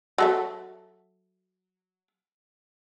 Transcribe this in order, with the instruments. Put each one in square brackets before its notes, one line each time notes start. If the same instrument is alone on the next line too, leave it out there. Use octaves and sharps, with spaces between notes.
[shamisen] F#3 A4 E5